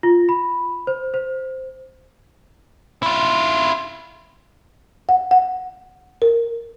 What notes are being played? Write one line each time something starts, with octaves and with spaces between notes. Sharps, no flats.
F4
B5
C5
C5
E4 F4
F#5
F#5
A#4